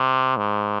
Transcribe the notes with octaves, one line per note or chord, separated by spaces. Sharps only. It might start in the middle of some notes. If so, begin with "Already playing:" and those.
Already playing: C3
G#2